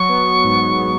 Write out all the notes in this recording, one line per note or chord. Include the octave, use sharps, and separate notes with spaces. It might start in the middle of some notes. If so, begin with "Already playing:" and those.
Already playing: F#3 C#6
B3
G#2